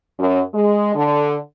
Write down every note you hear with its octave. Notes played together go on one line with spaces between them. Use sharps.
F#2
G#3
D3